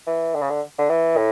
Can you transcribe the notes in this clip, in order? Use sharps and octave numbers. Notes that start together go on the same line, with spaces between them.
E3
D3
C#3
D3
D3
E3
A2